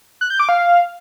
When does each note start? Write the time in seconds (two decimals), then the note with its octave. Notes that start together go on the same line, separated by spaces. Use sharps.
0.21 F#6
0.30 G6
0.39 D6
0.49 F5